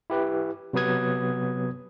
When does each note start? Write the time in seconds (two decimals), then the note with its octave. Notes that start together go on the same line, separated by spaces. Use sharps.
0.10 E4 G4 B4
0.73 C3 F#3 B3 B4 D#6 G#6